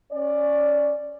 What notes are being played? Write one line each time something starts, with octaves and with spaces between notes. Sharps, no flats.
C#4 D5